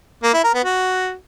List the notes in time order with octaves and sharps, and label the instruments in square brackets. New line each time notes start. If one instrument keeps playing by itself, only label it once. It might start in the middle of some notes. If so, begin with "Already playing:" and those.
[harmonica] A#3
E4
A#4
B3
F#4